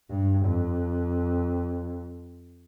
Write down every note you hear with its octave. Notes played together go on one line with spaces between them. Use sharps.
G2
F2